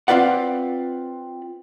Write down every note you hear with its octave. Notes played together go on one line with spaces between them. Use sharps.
C4 F4 B4 D5 F#5